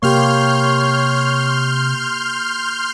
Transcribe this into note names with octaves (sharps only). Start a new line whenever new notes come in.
C3 A#3 G4 C#5 C6 F6 G6